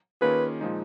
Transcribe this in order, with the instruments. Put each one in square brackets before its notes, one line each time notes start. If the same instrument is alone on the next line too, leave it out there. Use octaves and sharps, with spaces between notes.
[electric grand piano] D#3 A#3 C#4 F4 G#4 [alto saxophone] B4
[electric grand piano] A#2 F3 G#3 D#4